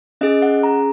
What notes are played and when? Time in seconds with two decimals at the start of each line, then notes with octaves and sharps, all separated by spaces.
0.21 C#4 G#4 D#5
0.42 F#5
0.63 A#5